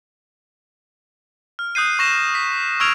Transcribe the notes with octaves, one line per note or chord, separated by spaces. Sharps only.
F6
D#6 F#6 G6 C7 D#7
C#6 A#6 E7
B6
C#6 E6 F6 G#6 D7 F7